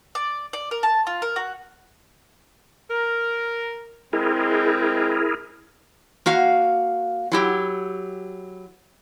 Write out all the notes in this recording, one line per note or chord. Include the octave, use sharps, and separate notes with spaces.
D5
D5
A#4
A5
F4
A#4
F#4
A#4
G#3 C4 E4 G#4 A#4
A#3 F#4 F5
F#3 E4 G4